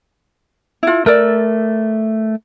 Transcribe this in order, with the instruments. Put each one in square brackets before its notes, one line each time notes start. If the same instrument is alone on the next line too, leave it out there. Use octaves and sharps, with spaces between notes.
[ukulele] E4 F4
[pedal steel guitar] A3 E6 [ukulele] A#4 D5